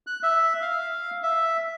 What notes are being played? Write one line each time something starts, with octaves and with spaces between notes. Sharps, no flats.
F#6
E5
F5
E5